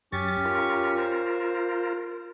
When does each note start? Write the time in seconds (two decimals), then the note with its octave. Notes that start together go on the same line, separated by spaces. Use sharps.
0.12 F#2 C#4 G4 C#6 A6
0.45 F4 A#4
0.98 C5